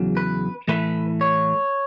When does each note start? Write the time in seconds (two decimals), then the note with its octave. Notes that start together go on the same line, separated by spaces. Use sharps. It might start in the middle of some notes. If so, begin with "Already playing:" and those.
Already playing: E2 C#3 F#3
0.17 B4
0.68 A2 E3 A3 B4
1.21 C#5